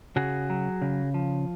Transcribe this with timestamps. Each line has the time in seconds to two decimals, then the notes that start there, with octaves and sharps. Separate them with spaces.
0.16 C#3 F#4 G#4
0.50 F#3
0.82 C#3
1.14 F3